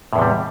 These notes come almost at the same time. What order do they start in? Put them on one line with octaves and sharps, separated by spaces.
A2 E2 C3 G3